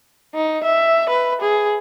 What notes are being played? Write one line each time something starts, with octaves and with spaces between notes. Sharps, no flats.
D#4
E5
B4
G#4